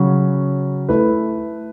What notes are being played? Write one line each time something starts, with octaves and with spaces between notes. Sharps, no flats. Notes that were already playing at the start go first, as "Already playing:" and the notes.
Already playing: C#3 F#3 C#4 F#4
A3 E4 B4